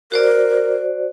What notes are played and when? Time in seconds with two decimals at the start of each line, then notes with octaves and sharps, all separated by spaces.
0.12 F#4 A#4 C5 D5